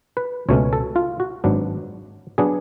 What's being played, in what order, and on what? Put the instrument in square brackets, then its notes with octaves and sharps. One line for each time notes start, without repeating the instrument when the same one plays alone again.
[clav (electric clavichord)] B4
C#2 B2 A3 C#4 C#5
A4
F4
F#4
G#1 G#2 F#3 B3 D4
F#3 B3 D4 G#4